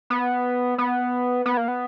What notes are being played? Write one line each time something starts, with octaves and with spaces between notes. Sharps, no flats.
B3
B3
B3
A#3
B3